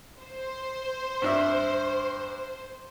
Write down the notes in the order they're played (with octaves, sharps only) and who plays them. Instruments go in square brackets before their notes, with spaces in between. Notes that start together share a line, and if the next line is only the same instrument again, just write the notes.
[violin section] C5
[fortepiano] G2 D4 E5